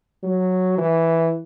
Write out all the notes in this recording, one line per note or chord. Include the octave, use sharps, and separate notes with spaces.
F#3
E3